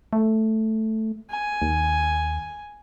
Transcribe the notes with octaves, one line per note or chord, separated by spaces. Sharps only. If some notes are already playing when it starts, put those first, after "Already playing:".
A3
G#5
D#2